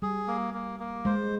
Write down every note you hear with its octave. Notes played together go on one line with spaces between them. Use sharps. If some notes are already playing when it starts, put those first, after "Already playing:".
G3 G#4
A#3
A#3
A#3
G#3 C5